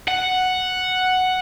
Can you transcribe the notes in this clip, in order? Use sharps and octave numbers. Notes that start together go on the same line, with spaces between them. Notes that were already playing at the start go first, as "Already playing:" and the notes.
F#5